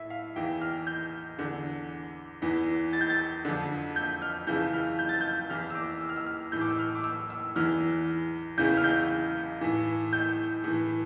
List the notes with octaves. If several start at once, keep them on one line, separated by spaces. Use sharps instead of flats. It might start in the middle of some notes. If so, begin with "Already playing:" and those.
Already playing: A2 E5
F5
E2 E3 G5
F6
G6
E2 D3
E2 E3
A6
G6
A6
F2 D3
G6
F6
F2 C#3 E3 G6
F6
G6
A6
G6
E2 E3 F6
E6
D6
E6
F6
E6
F6
A2 E3 G6
D6
E6
F6
D6
E6
E6
E2 E3 F6
E2 C#3 E3 G6
F6
G6
A2 E3
G6
A2 E3